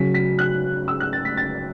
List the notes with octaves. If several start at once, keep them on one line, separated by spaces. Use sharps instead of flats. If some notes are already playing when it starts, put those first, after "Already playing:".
Already playing: C#3 F#3 B6
B6
F#6
E6
F#6
A6
B6
A6